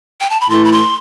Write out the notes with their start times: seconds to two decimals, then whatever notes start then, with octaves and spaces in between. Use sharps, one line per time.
0.20 G5
0.30 A5
0.41 B5
0.50 A2 E3 A3 C6
0.65 B5
0.72 C6